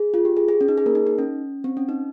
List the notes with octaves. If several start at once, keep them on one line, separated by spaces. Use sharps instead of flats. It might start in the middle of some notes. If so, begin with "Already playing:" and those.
Already playing: G#4
F4
G4
G#4
G#4
C#4
D#4
G#4
A#3 A#4
D#4
D#4
C#4
C4
C#4
D#4